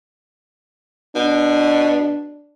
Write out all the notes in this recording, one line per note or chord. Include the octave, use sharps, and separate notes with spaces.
B2 D4